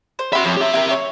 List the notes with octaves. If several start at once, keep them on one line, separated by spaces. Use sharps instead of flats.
C5
F#4 G4 E5 B5 C6
F2 C#5
G4 E5
E4 A#4 G5
C#5